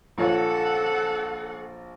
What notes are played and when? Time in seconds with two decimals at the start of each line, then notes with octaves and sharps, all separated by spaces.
0.18 A#1 F4 A4 C#5 F#5